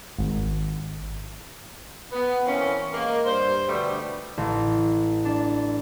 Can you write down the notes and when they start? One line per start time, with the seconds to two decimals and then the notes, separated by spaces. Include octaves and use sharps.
0.19 G#1
2.12 B3
2.46 E3 A#3 C4 C#4
2.93 G#3 A#3
3.25 G2 C5
3.68 B2 D3 G3 A3 B3
4.37 A1
5.25 D4